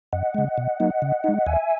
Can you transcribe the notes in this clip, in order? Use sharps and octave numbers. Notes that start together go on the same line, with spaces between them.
F#2 D#5 F#5
C#3 G#3
B2
F#3 A#3 D#4
C#3
G#3 D#4
D#2 E5 G#5